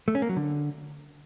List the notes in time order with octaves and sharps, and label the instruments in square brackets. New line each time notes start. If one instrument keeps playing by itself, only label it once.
[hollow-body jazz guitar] A3
C#4
A#3
F#3
D3